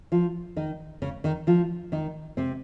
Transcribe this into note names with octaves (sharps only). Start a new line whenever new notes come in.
F3 F4
D#3 D#4
C#3 C#4
D#3 D#4
F3 F4
D#3 D#4
C3 C4